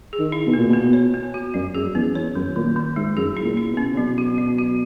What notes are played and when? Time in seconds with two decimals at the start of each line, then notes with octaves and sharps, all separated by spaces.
0.13 G#4
0.19 D#3
0.32 E4
0.46 B2
0.54 A#2 B3
0.69 B2 B3
0.93 C#5
1.14 B3
1.34 F#4
1.54 F#2 F#3
1.75 F#2 G#4
1.95 E2 C#4
2.15 E2 C#5
2.35 F#2 D#3
2.56 A#2 D#3
2.76 D#3
2.96 G#2 G#3
3.17 F#2 G#4
3.37 E4
3.44 A#2
3.57 E4
3.71 B2
3.77 C#4
3.93 C#3
3.97 B2 F#3
4.18 F#4
4.38 F#3
4.58 F#4